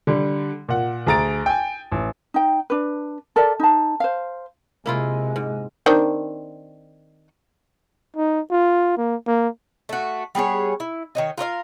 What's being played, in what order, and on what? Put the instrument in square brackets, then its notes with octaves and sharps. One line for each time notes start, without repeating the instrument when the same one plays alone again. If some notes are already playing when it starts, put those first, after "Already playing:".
[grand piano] D3 G3
A#2 F#5
D2 G#4 A#5 A6 D7
G5 G#5
A1
[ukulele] D#4 G5
D4 B4
A4 A#4 D5 E5
D#4 A5
C5 F5
[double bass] C3 G#3 [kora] A#3 E4 F4
[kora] G#2
[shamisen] D#3 C4 D4
[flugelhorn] D#4
F4
A#3
A#3
[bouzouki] A3 F#4
G3 B3 G#4 C#5
E4
D#3 C#5 D#5
F4 A#4 C#5 F5